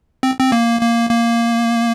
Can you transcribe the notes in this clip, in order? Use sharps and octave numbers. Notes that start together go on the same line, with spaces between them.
C4
C4
A#3
A#3
A#3